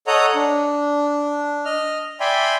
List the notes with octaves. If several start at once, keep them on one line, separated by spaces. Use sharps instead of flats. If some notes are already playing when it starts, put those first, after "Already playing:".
A4 C#5 D#5 F#5 A#5 D#6
D4
D#5 F6
D5 E5 G5 G#5 B5 C6